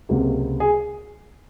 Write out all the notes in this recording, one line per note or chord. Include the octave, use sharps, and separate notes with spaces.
C#2 C3 F#3 A#3
G#4